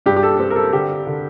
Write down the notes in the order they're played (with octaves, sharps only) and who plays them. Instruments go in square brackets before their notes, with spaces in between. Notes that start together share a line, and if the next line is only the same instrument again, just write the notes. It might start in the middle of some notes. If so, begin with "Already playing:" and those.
[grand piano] G2 G4
G4
A4
C4
A#4
A4
D3 G4
D3